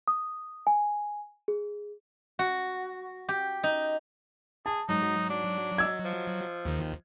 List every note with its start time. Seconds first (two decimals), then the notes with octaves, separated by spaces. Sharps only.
0.08 D#6
0.67 G#5
1.48 G#4
2.39 F#4
3.29 G4
3.63 D#4
4.66 G#4 A5
4.89 G#2 F#3 D#4
5.30 D4
5.78 D#5 E6 G#6
6.04 F3
6.65 D#2 D#3